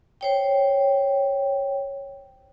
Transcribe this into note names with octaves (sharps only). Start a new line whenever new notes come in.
C5 C#5 G5